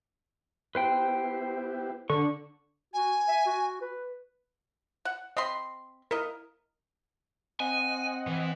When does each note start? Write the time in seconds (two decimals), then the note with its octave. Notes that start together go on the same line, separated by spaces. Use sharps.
0.75 B3 E4 G4 B4 C5 G5
2.10 D3 C#6
2.94 F#4 G#5
3.28 E5
3.46 F#4
3.81 B4
5.05 F#5
5.37 C4 D#5 B5 C6
6.11 E4 A#4 D#5
7.60 C4 D#5 F#5 G#5
8.27 E3